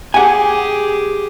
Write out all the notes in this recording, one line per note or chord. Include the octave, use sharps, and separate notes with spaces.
G4 G#4 F#5 G#5